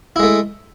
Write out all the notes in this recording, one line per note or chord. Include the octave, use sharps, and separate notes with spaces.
G#3 A3 E4